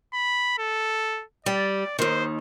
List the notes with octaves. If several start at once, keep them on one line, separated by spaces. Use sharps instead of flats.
B5
A4
G3 D5
D#2 D#3 C5